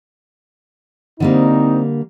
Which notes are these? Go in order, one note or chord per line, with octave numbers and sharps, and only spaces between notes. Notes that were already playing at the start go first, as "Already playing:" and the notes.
D3 G3 A#3 C4 D#4